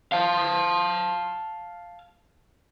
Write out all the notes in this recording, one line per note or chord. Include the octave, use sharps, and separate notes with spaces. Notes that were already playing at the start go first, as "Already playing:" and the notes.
F5 A5